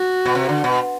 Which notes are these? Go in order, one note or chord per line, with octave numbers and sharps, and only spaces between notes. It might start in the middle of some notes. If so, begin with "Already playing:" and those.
Already playing: F#4
B2
C3
D3
B2